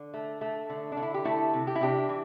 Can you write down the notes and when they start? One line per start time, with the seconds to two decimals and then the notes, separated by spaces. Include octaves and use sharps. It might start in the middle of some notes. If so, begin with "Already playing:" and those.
Already playing: D3
0.14 A3
0.41 A3
0.70 D3
0.92 D4
0.97 D3
1.02 E4
1.14 G4
1.25 A3 E4 A4
1.53 C3
1.67 G4
1.75 E4
1.81 C3 D4 G4
2.09 E3